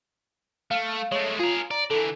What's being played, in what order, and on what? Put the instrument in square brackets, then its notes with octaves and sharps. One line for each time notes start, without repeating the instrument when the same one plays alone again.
[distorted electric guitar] A3 [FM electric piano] F5
[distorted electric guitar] G#3 A3 [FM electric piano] C#5
[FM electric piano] F4 [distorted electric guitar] G#4 A#4
[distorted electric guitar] D5 [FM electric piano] A#5
[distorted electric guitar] D3 E3 [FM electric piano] A4